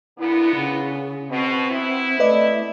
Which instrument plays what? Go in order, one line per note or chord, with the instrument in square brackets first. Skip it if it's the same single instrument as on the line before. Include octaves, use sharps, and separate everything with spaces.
[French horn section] A#2 D3 B3 [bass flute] E4
[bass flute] C#3
[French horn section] B2 [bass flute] C4
[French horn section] B3 E4
[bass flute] A3 [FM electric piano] B4 D5 D#5